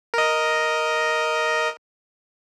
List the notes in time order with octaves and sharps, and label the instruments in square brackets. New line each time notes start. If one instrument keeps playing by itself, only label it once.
[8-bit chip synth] A#4 D#5